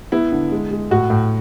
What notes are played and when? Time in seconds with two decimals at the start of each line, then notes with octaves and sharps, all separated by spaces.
0.12 B3 E4
0.32 D3
0.51 G#3
0.71 G#3
0.91 A2 F#4
1.10 A2